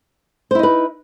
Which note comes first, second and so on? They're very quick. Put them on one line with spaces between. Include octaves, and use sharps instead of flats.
C5 E4 D#4 B4